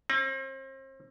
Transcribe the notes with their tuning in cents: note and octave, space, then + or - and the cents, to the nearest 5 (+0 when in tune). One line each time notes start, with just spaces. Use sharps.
C4 +40